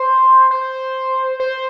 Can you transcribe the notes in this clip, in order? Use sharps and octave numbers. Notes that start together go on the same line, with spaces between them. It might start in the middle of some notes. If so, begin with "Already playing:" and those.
Already playing: C5
C5
C5